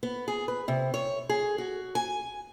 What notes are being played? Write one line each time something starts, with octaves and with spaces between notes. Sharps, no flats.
B3
G#4
B4
C3
C#5
G#4
F#4
G#5